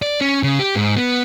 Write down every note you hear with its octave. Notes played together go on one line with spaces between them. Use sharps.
D5
C#4
C#3
G4
G#2
B3